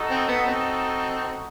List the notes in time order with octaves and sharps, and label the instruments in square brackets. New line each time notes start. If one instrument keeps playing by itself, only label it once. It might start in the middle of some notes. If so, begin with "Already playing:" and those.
Already playing: [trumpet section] D#4 F#4 A4
[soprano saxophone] C4
B3
C4